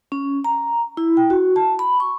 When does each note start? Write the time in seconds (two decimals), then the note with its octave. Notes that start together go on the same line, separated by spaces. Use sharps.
0.12 C#4
0.44 A#5
0.97 E4
1.17 G5
1.30 F#4
1.56 A5
1.79 B5
2.00 C#6